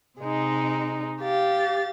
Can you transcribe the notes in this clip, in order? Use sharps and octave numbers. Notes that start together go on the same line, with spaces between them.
C3 G#3 D#4
G4 F5 A6